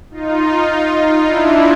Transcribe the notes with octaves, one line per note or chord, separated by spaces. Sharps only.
D#4 F4
D#4 F4
D4 E4